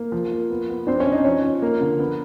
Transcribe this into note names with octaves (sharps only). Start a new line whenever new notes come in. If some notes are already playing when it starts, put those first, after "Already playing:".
Already playing: A#3
F3
A#3
B3
B3
C4 D4 C5
C#4 C#5
D4
D#4 D#5
F3 C#4 C#5
F3
A#3 A#4
D3
B3